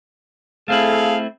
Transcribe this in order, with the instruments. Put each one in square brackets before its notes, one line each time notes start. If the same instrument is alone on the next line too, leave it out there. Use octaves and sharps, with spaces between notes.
[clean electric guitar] A3 C4 E4 [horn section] G#4 A4 F5